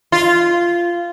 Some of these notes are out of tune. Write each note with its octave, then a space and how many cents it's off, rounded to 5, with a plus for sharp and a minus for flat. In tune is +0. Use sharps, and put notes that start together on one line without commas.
F4 -15